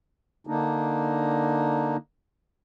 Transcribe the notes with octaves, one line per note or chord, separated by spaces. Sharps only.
D3 A#3 D4 D#4